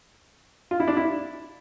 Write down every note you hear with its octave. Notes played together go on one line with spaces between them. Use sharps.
F4
E4
D4
E4